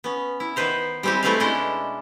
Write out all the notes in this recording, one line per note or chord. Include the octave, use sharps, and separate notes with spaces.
B3 C#4
E4
D#3 B3 B4 C5 A#5
G3 G#3 C4 E4 G4
A3 C4 E4 F4 B4 F5
B2 G#3 C#4 D4 E4 D#5